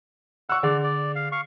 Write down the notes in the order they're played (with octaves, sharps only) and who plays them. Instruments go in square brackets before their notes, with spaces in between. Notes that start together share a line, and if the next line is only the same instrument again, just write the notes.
[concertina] F#5 [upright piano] C#6 E6
[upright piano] D3 [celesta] G#4 F#5 [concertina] D5
[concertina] D5
F5
F5 C#6